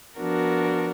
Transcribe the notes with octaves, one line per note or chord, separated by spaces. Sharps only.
F3 B3 D4 F#4 A#4